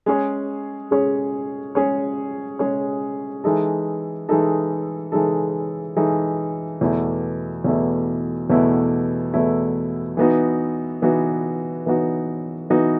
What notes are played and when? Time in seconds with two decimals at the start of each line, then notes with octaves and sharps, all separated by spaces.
0.06 G#3 C#4 G#4 C#5
0.91 G#3 C#4 G#4 C#5
1.75 G#3 C#4 G#4 C#5
2.59 G#3 C#4 G#4 C#5
3.44 E3 G#3 D#4 A4
4.29 E3 G#3 D#4 A4
5.12 E3 G#3 D#4 A4
5.96 E3 G#3 D#4 A4
6.81 E2 B2 A3 E4
7.64 E2 B2 A3 E4
8.50 E2 B2 A3 E4
9.34 E2 B2 A3 E4
10.17 E3 B3 D#4 F#4
11.02 E3 B3 D#4 F#4
11.86 E3 B3 D#4 F#4
12.70 E3 B3 D#4 F#4